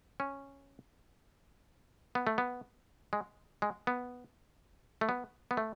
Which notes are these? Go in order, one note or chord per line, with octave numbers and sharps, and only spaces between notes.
C#4
B3
A3
B3
G#3
G#3
B3
A3
B3
B3
A3